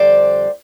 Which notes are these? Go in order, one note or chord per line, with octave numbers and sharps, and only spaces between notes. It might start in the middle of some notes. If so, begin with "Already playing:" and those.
Already playing: F2 D3 G3 C5 D5